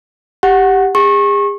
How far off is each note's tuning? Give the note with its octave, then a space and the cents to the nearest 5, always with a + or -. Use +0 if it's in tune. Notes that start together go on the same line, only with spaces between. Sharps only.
G4 +0 F#5 +0
G#4 -40 C#6 -30